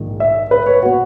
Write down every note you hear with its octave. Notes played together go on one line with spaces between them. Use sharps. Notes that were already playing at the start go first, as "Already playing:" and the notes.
Already playing: A#1 G#2 D#3
E5
B4
C#5
B2 F#4